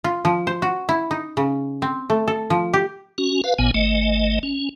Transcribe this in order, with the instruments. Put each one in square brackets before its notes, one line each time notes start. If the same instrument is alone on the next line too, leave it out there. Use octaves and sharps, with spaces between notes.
[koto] F4
F3
C5
F#4
E4
D#4
C#3
C4
A3
A4
F3
G4
[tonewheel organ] C#4 F#4
B4 F5
A1 A#2 B3 G#5
G#1 A3 D#5
C#4